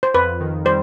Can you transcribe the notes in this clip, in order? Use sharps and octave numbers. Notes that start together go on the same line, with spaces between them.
C5
F2 B4
D#3
G3 C5